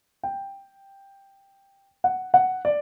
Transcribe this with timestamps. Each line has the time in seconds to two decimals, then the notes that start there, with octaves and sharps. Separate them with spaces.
0.23 G5
2.04 F#5
2.34 F#5
2.65 D5